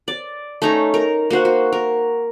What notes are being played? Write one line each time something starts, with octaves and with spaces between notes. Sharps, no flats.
D5
A3 C#4 D#4 A#5
A#4
A#3 F#4 C5 F#5
F#4
A#4